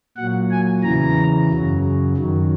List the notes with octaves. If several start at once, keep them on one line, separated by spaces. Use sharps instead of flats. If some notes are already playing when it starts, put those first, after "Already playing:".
A#2 F#3 F#5
G#5
E2 C#3 E3 A#5
F#2 C#3 F#3
F#2 D#3 F#3